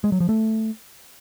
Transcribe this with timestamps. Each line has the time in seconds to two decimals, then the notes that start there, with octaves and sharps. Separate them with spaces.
0.04 G#3
0.12 F#3
0.20 F3
0.29 A3